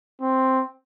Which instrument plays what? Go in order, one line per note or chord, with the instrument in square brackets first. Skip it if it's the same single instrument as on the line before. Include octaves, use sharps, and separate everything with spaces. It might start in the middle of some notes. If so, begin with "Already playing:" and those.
[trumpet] C4